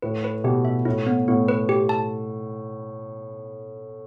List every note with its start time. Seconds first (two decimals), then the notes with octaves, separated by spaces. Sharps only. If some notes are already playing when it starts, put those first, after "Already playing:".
0.02 A2 B4
0.24 B4
0.44 B2 G4
0.65 E5
0.85 A2 E4
1.07 B3
1.28 A2 B3
1.48 B4
1.69 G4
1.89 A5